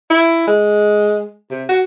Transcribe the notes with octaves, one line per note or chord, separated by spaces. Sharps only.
E4
G#3
C3
F#4